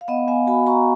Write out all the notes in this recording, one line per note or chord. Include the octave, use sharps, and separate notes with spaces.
F5
B3 D#5 F#5
B3 F5 G#5
F#4 G#5 B5
F#4 A#5 C#6